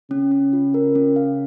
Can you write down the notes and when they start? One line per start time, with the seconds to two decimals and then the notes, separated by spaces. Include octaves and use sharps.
0.10 C#3 C#4
0.31 C#4
0.53 F4
0.74 A#4
0.95 C#4
1.16 F5